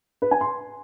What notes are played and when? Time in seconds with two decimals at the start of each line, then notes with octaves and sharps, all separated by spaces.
0.22 B4
0.31 G#5
0.41 C6